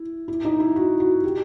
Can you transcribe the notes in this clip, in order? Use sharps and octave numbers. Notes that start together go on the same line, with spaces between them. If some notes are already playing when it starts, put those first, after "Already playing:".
Already playing: E4
E4
D#4
E4
F#4
F#4
G4